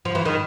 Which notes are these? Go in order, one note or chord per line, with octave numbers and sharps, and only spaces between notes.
F3
E3
D#3